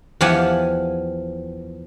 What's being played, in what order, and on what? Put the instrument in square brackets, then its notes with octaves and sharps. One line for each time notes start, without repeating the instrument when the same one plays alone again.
[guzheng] E2 E3 F3 G4 F#5 G#5